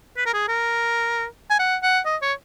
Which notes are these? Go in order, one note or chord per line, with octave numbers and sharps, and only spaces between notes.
B4
A#4
G#4
A#4
G#5
F#5
F#5
D#5
C#5